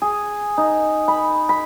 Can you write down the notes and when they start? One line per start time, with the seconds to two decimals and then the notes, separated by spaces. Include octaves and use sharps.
0.02 G#4
0.58 D#4
1.08 B5
1.49 B5